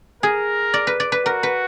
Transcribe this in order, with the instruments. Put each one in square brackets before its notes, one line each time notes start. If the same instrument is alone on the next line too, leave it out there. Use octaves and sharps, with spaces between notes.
[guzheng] G#4 [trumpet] A#4
[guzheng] D5
B4
D5
B4
[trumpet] F#4 [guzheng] A#4
[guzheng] B4